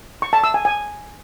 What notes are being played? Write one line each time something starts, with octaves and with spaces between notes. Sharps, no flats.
C#6
A5
E6
G#5
G#5